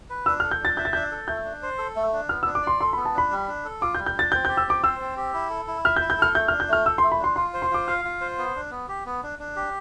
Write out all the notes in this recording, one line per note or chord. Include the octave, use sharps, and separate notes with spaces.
B4
D4 E6
F6
A4
G6
D4 A6
E5 G6
A6
D4 G6
A4
A3 G6
D4
C5
A4
A3
D4
B3 F6
D4 E6
D6
D5 C6
A4 C6
B3 B5
A5
D4 B5
G3
D4
A4
F4 D6
G6
G3
G6
D4 A6
C4 G6
G6
G4
E6
C4 D6
C5 E6
C4
G4
E4
A4
E4
E5 F6
G6
E4
G6
A4 F6
A3 G6
D4 F6
G6
A3 F6
A4 E6
C6
A3
B5
D4 C6
F4 C6
C5
C6
F4 D6
F5 F6
F4
C5
B3
D4
B3
G4
B3
D4
D4
G4